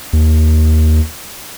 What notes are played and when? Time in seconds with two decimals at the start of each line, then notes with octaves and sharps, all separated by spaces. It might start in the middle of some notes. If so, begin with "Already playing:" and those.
0.13 D#2